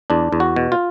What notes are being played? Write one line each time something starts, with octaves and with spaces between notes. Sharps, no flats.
E2 D4
E2
F#4
B2
F4